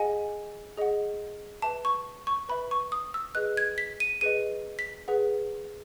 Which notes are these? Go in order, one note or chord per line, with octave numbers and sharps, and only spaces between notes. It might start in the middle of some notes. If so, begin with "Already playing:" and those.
Already playing: G#4 D#5 F#5 G#5
G#4 D#5 F#5
B4 E5 A5
C#6
C#6
B4 E5 B5
C#6
D#6
E6
G#4 B4 D#5 F#6
G#6
B6
D#7
G#4 B4 D#5 D#7
B6
G#4 B4 F#5